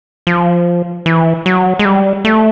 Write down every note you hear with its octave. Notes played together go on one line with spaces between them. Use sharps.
F3
E3
F#3
G#3
G3
A3